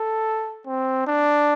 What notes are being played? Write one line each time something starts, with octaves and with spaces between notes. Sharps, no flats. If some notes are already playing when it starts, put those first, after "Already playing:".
Already playing: A4
C4
D4